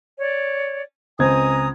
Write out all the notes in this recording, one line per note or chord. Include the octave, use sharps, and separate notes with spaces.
C#5 D5
C#2 C4 G#5 A#5 D#6 G#6